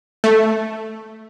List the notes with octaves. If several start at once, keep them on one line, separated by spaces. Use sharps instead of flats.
A3